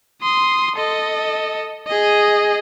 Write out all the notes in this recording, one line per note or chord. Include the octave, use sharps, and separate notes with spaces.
C6 D#6
A4 D#5
G#4 D#5